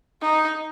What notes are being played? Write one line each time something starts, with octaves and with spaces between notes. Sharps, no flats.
D#4